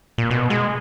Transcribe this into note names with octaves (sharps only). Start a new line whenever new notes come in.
A#2
B2
G#3